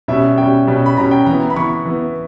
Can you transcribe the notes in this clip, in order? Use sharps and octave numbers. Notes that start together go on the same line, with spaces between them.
B2 G3 C#4 E5
B2 G3 C#4 G5
B2 G3 C#4
B5
B2 G3 C#4 A#5
G5
E3 B3 A#5
B5
E3 B3 C#6
E3 B3